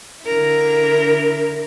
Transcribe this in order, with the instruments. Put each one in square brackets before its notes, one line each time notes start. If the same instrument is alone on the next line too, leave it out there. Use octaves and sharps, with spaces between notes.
[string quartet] D3 E4 A#4